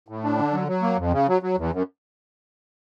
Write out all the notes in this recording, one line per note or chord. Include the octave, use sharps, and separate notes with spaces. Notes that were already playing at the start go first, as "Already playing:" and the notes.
A2
D4
D3
F#3
F#3
A#3
F2
C#3
F#3
F#3
E2
F#2